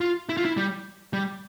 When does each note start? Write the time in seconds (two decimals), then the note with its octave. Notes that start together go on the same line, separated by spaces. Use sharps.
0.01 F4
0.29 E4
0.37 F4
0.45 E4
0.57 G3
1.13 G3